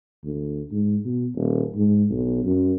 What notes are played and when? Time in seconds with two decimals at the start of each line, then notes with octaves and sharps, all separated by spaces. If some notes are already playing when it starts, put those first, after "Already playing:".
0.24 D2
0.72 G#2
1.05 B2
1.36 D#1
1.75 G#2
2.10 B1
2.45 F#2